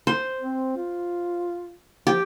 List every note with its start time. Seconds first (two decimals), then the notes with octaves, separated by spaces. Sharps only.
0.07 C5
0.41 C4
0.77 F4
2.07 F3 G4